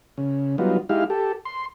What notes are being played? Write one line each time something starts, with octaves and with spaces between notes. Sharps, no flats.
C#3
F#3 G3 B3 D#4 F4
G#3 D#4 E4 G4 F5
G4 A4
C6